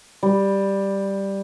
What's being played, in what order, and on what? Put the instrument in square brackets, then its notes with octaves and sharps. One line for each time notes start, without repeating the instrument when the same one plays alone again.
[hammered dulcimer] G3